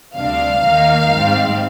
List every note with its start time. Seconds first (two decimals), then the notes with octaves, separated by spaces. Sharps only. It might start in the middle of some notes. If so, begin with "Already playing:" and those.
0.15 D2 C3 G3 D4 F5
0.63 D#2 D#3 A#3 D#4
1.11 G#2 G3 C4